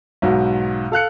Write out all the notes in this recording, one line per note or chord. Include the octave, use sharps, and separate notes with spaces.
B1 G#2 B2
A4 F5 F#6 C#7